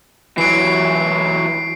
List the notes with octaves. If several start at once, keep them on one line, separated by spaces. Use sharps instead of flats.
E3 F#3 C7 D7